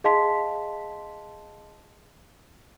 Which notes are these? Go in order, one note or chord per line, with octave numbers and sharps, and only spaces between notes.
G#4 D#5 F5 A5 C6 B6